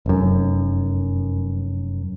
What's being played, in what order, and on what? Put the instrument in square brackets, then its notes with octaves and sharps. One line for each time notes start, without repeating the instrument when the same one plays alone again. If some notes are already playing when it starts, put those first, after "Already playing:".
[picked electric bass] F1 F#2